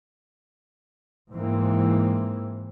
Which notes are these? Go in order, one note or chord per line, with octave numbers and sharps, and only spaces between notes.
G#2 E3 A#3 C4